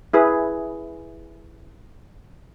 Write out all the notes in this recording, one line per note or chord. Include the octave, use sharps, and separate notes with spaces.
E4 G#4 B4